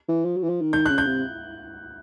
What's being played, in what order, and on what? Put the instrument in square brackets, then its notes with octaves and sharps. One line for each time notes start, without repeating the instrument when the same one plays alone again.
[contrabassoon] E3
F3
F#3
E3
F3
D#3
[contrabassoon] D#3 [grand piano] G6
[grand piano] F#6
[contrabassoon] C#3
[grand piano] G6
[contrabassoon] C3